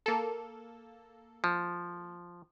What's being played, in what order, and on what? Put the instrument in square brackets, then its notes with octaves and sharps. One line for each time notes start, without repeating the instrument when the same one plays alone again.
[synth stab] A#3 A4
[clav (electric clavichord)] F3